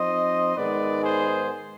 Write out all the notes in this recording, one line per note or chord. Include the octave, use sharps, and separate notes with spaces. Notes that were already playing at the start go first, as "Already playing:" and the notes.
Already playing: F3 C4 D#4 C5 D#5
G#2 D#3 G#3 B3 B4 D5
G#4 C5